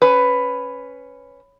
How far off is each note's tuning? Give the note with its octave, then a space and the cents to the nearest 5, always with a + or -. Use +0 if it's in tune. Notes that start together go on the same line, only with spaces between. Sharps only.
C#4 +0 B4 +10